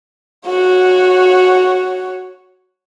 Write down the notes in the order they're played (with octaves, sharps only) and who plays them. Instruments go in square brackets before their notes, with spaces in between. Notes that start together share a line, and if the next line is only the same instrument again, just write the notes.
[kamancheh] F#4 C#5